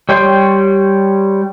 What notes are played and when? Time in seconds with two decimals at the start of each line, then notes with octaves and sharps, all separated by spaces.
0.09 G3 C#5 G5 C6